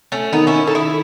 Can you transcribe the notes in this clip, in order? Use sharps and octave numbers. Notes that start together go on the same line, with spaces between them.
A3 C#4
D#3 B3 D#4
C#4 E4
A4
E4 G#4